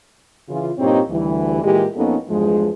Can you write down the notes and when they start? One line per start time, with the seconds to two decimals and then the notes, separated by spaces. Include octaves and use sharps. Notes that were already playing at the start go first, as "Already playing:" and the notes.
0.49 C#3 E3 F4
0.79 G2 A#2 C4 D#4 G4 C#5
1.10 D2 E3 G3
1.64 A#2 E3 G#3 G4
1.96 F2 A#3 B3 C#4 D#4 A4
2.29 E2 G2 F3 G#3